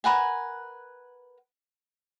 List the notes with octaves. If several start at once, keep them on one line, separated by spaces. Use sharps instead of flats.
A#4 B4 F#5 G#5